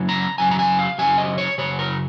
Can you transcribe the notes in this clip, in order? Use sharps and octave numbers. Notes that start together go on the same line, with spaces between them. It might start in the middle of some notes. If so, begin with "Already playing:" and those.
Already playing: F#2 C#3 F#3
A#5
F#2 C#3 F#3 G#5
A#5
G#5
F5
F#2 C#3 F#3 G#5
D#5
C#5
F#2 C#3 F#3 C#5
A#4